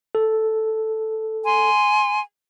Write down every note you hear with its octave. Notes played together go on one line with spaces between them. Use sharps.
A4
G#5 C6